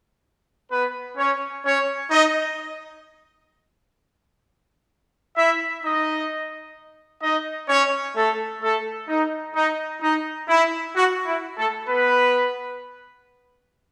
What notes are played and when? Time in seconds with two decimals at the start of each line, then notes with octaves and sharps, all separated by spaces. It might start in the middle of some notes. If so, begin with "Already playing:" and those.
0.71 B3 B4
1.18 C#4 C#5
1.65 C#4 C#5
2.10 D#4 D#5
5.36 E4 E5
5.83 D#4 D#5
7.22 D#4 D#5
7.68 C#4 C#5
8.16 A3 A4
8.63 A3 A4
9.08 D#4
9.55 D#4
10.01 D#4
10.49 E4
10.95 F#4
11.26 E4
11.57 A3 A4
11.88 B3 B4